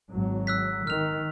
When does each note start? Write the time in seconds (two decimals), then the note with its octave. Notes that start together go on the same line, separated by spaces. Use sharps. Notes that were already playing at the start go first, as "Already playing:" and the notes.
0.10 G#1 F#3
0.47 E6 F#6 B6
0.87 D#3 F6 F7